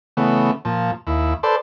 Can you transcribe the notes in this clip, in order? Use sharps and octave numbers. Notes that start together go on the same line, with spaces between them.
C#3 E3 A3 B3
A#2 F3 A5
D#2 E4
A4 B4 C5 D5 A5 C6